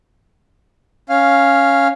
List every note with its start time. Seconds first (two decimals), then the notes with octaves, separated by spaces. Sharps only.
1.09 C#4 F5